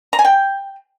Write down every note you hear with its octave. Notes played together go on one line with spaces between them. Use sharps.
A#5
G#5
G5